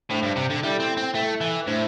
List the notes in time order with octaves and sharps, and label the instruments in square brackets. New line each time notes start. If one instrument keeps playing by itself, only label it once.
[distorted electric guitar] A2 [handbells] D4 C5 G5
[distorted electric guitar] G2
C3
D3
[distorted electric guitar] G3 [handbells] E4 A4 E5 G5
[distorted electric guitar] C4
C4
[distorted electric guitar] A3 [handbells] E4 A4 E5 G5
[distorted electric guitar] E3
[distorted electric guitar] A2 [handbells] D4 C5 E5